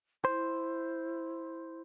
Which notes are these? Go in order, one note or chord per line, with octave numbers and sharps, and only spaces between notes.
E4 C5